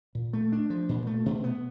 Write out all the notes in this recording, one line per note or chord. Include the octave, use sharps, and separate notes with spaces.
A#2
A3
D4
F3
A#2
A3
B2
B3